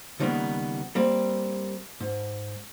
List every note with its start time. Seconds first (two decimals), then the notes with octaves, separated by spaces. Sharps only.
0.20 C#2 D#3 G3 A#3 B3
0.95 G3 A#3 C4
2.01 G#2